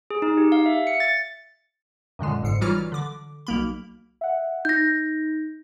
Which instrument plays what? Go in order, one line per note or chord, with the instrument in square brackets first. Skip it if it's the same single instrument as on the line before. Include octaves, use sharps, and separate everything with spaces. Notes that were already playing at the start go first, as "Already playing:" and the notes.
[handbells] G#4
D#4
G4
F5
E5
C#7
A6
[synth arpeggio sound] F#2 A#2 D3 G#3
G1 G#2 C7 C#7
E3 F#3 G3 F4 A#5 F6
D3 D6
B1 A#3 B5
[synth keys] E5 F#5
[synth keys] D#4 [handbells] G6 A#6